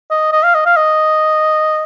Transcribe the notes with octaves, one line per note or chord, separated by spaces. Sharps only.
D#5
D#5
F5
D#5
F5
D#5